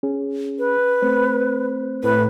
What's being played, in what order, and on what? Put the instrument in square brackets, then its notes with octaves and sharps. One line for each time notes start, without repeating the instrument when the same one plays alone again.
[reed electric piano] C#4 G#4
[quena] B4
[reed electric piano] A3 C4 C5
[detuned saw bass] A2 [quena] B4